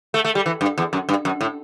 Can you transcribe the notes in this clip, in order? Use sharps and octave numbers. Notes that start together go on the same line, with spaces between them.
A3
A3
G3
E3
G2
E2
F#2
G2
F#2
A2